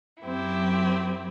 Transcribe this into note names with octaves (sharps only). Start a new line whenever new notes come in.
F#2 F#3 C4 E4 G4